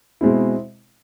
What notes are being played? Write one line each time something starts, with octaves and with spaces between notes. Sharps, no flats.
B2 G#3 C4 E4